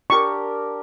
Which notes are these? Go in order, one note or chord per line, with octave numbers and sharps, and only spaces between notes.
D4 G4 A#4 C#6